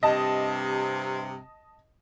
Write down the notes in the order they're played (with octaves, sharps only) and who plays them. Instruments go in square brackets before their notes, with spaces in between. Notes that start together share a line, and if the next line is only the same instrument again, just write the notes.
[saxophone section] G2 C3 [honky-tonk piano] D#5 A5